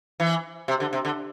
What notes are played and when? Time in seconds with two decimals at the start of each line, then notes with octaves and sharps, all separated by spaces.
0.20 E3
0.68 C3
0.80 D3
0.93 C3
1.05 D3